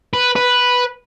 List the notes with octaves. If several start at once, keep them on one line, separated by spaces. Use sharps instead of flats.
B4
B4